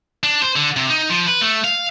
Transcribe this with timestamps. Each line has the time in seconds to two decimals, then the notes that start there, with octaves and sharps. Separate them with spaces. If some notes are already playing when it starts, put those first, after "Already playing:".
0.23 D4
0.42 C5
0.56 D3
0.76 C3
0.90 D#4
1.10 F3
1.26 B4
1.41 A3
1.64 F5